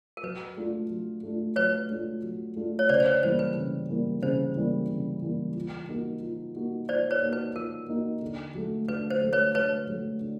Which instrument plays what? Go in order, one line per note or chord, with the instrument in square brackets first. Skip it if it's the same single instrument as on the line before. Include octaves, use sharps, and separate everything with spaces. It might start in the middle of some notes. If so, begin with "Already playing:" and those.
[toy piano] A#4
[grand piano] F#3 [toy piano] B4
[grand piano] A3 D4 F4
F#3
A3 D4 F4
[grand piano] F#3 [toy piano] B4 C#5
[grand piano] A3 D4 F4
F#3
A3 D4 F4
[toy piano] C#5
[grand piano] C#3 [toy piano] C5 D5
[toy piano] C5
B4 C#5
[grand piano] E3 G3 A#3 [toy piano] C5
[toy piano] B4
[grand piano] C#3
E3 G3 A#3
[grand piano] C#3 [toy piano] C5
[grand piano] E3 G3 A#3
C#3
E3 G3 A#3
F3
A#3 D#4 F#4
F3
A#3 D#4 F#4
[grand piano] F3 [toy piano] C5 D5
[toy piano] B4 C#5
[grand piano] A#3 D#4 F#4
[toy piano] B4
[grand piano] F3 [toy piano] A#4
[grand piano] A#3 D#4 F#4
D3
F#3 A3
[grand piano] D3 [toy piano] B4
[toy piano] C5
[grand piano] F#3 A3
[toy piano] B4 C#5
[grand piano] D3 [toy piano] B4 C#5
[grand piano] F#3 A3
D3